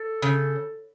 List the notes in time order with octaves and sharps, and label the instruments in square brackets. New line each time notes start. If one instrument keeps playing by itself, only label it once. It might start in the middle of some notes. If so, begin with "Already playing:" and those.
Already playing: [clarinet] A4
[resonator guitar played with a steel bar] C#3